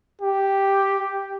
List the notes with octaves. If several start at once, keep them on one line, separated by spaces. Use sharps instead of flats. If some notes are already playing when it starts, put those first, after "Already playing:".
G4